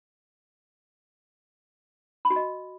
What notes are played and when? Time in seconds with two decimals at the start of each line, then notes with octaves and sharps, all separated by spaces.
2.25 B5
2.30 F#4
2.36 D#5